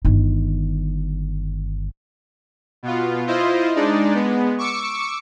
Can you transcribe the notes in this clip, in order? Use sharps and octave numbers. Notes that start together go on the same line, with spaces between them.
G1 D#3
B2 B3 F4
E4 F4 C5 D#5
G#3 D4 D#4 D5
G#3 B3
C#6 D6 E6 C#7